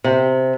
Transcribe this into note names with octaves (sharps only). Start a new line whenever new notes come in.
C3